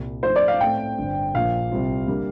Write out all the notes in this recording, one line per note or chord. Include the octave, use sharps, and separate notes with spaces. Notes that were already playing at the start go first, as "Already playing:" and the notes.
Already playing: C2 A#2 G3
G2 F3 A3 D#4 C5
D5
F5
A2 A3 C4 G5
G1 G2 D3
A#1 A#2 F3 F5
C2 C3 G3 C4 F4
D3 G3 A#3